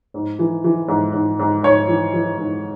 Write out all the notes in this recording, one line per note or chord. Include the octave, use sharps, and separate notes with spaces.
G#2
E3
E3
G#2
G#2
G#2
G#2 C#5
E3
E3
G#2